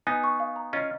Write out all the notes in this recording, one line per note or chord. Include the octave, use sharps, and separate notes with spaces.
B3 D#4 G#5
C#6
F5
A#5
C#4 F4 D#5